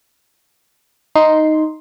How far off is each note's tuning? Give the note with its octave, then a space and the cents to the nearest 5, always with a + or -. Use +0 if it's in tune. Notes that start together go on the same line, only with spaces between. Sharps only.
D#4 +0 C6 +0